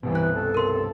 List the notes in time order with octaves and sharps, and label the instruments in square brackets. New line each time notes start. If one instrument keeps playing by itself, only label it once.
[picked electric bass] C2 G2 B2 [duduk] E3
[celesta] F#6
[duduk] A4
[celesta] A#4 C6